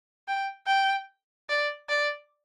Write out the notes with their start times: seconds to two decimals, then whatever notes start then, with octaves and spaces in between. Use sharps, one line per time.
0.28 G5
0.67 G5
1.49 D5
1.89 D5